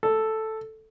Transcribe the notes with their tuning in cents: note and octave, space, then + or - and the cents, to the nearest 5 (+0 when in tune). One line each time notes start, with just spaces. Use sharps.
A4 +0